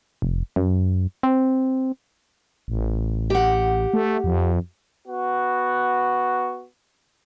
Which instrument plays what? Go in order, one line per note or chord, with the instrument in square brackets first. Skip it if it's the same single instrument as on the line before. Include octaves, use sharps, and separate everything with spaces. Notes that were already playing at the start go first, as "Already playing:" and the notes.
[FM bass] F1
F#2
C4
A1
[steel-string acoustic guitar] G4 F#5
[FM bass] A3
F2
[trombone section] B3 F#4